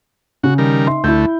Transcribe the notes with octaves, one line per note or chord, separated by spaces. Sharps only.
C#3 F#4
D#3 G3 A#4
D#4 E5 C6
D2 A3 E4 G6